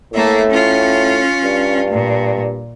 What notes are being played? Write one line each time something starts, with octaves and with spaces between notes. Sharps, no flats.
A2 A3 A#3 E5
C#4 F4
G2
A#2